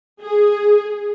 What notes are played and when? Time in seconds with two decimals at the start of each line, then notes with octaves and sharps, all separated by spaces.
0.21 G#4